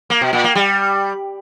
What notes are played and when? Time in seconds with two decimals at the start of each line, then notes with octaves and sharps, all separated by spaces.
0.10 A#3
0.21 B2
0.33 A#2
0.44 A#3
0.55 G3